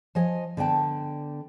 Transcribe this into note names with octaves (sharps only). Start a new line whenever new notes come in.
F3 C#5 D#5 G#5
D3 B3 D5 G5 A5